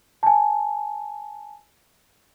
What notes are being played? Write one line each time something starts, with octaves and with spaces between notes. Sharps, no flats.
G#5 A5